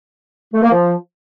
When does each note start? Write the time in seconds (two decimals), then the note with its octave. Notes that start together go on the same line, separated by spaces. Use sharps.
0.54 A3
0.63 A#3
0.72 F3